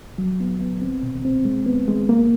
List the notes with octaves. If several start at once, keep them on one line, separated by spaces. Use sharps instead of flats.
F#3
B3
B3
C4
B2
C4
G#3
B3
G#3
A#3